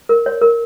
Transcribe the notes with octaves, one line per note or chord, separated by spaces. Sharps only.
A#4
C#5
A#4